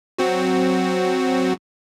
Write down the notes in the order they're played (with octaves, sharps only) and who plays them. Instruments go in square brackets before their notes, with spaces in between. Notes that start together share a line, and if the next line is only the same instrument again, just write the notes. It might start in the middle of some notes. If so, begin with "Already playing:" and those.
[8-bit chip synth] F#3 C4 F#4